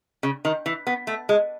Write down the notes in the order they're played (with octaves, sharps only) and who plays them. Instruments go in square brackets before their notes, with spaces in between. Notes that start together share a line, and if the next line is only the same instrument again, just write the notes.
[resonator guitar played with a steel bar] C#3
D#3
E3
B3
A3
G#3